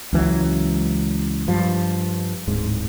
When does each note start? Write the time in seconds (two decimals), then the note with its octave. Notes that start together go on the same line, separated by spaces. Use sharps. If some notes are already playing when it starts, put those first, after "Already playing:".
0.13 C#2 E3 F#3
1.48 G2 F3
2.47 D1 G#2